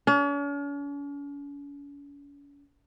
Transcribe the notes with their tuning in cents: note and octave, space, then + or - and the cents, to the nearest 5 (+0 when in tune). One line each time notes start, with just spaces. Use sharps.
C#4 +45